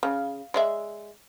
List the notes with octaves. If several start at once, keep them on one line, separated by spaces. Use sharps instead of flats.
C#3
G#3 D5 E5